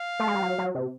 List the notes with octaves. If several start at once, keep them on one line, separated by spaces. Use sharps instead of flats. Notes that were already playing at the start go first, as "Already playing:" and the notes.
Already playing: F5
A3
G#3
G3
F#3
F#3
C3